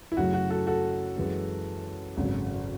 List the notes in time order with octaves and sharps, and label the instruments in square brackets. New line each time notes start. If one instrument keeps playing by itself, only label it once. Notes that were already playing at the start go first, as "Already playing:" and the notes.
[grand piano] E4
F#2 C#3 F#3 A3 F#4
F#4
F#4 A4
F#4 A4
F#2 E3 G#3
G#1 F#2 C#3